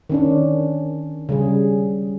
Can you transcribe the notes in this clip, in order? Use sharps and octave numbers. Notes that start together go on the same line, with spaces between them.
D#3 C#4 D4
C#3 G3 G#4